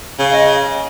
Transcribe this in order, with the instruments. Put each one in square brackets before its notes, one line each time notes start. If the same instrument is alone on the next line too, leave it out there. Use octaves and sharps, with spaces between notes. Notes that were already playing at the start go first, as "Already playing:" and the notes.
[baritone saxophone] C#3 [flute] F5
[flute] D#5